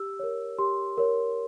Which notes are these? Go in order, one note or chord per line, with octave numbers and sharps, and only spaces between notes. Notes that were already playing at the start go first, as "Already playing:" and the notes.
Already playing: G4 E6
A#4 C#5
G4 C6
A#4 C#5